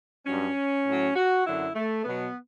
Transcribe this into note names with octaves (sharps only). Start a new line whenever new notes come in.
G2 F#3 C#4
A2 F#3
F#4
F#2 D3 F#3 E4
A3
B2 F#3 B3